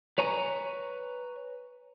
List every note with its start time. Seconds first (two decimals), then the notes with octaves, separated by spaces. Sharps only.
0.18 B4 C#5 G#5 A#5